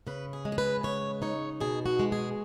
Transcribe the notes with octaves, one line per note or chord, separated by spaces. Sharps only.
C#3 B4
G#4
G#3
G#4
B4
C#3 C#5
D#4 C#5
B2 G#4
F#4
G#3
G#4